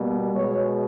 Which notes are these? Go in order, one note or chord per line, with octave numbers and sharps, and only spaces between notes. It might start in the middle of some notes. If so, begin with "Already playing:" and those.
Already playing: B2 G3 A#3
B2 G#3 C#5